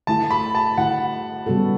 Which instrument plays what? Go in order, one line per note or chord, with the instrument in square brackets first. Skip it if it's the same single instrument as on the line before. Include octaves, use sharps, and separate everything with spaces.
[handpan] D3 A3 E4 G4 [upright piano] A5
[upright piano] B5
A5
[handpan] D3 A3 E4 G4 [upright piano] F#5
[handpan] C#3 G3 B3 F#4 A4